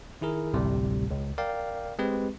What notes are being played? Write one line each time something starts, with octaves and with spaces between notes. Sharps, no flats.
D#3 E4 G#4 A#4
A1 D2 A2 C3 G3
C#2
A#4 D5 F5 G5
G#3 C4 G4 B4